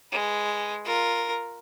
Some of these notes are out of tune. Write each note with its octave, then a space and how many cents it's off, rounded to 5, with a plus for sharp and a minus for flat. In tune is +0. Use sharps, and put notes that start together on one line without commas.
G#3 +0 B4 +0
F4 +0 A#4 +0